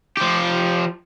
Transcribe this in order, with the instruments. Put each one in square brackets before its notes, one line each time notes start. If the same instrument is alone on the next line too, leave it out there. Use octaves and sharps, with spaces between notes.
[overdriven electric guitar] F3 G4